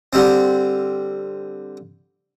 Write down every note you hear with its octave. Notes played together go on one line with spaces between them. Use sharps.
D3 G3 C4